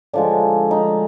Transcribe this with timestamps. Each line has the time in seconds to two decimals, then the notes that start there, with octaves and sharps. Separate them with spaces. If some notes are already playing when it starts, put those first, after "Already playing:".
0.13 D3 F3 G#3 D4
0.71 D#4